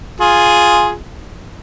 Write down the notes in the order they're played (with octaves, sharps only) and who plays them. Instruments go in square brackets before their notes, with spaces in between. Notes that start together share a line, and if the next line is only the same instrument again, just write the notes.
[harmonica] F4 G#4